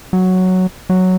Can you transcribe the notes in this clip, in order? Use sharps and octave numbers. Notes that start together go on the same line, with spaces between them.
F#3
F#3